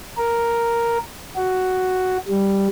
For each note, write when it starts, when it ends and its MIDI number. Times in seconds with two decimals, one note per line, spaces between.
0.17 0.98 70
1.36 2.17 66
2.28 2.68 55